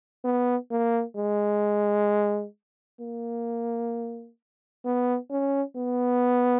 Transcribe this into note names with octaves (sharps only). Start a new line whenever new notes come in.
B3
A#3
G#3
A#3
B3
C#4
B3